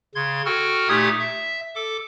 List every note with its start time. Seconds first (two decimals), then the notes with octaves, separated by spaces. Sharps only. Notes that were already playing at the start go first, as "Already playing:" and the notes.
0.15 C#3 C6 G#6
0.46 F#4 A4 G5 F6
0.88 A#2 A3 D#4 G4 D#6 G#6
1.19 E5
1.75 A4 D6